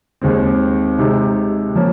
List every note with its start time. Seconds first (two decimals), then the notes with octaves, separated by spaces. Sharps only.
0.22 D#2 D#3 G#3 C4
0.98 C3 D#3 G#3 D#4
1.75 F3 A#3 C#4